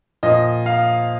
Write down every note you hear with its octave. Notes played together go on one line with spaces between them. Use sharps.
A#2 F3 D#5
F5